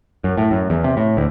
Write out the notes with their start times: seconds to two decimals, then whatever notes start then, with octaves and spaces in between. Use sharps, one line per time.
0.24 F#2
0.37 A2
0.51 F#2
0.70 E2
0.84 C3
0.97 A2
1.17 D2